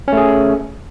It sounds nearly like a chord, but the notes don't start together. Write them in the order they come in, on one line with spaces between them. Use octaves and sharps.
C#4 A3 G#4